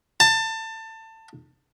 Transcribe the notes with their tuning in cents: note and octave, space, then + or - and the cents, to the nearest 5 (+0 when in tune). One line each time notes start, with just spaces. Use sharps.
A5 +25